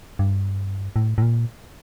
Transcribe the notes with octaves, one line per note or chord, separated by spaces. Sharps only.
G2
A2
A2
A#2